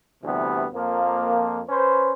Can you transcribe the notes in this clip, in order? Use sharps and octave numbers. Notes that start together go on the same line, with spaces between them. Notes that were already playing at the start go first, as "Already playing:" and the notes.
D2 C3 E3 G3 B3
F2 F3 A#3
C#4 B4 C5